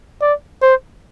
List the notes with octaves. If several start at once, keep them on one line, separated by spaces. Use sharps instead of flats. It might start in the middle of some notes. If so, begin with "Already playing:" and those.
D5
C5